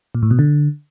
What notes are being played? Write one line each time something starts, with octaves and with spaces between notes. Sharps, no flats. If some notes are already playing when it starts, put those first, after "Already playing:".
A#2
A2
B2
D3